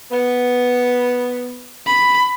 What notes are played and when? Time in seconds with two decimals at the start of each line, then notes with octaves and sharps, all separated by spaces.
0.10 B3
1.87 B5